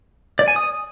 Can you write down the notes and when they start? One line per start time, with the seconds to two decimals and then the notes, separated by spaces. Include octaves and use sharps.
0.39 D5
0.48 G#5
0.56 D#6